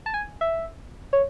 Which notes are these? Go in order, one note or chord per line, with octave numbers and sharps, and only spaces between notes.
A5
G#5
E5
C#5